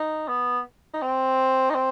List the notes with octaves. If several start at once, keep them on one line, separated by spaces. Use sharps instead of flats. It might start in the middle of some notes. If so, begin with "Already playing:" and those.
Already playing: D#4
B3
D#4
C4
D#4
C4